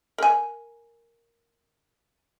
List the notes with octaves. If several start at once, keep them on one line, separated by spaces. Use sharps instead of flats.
A#4 G#5